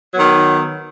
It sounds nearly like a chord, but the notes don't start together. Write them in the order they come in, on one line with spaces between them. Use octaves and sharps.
F#3 B3 D#3